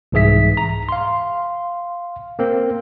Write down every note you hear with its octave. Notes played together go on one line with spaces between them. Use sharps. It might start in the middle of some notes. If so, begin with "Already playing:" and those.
C2 G#2 E3 G#4 E5 B6
A#5
F5 C6
A#3 C4 A#4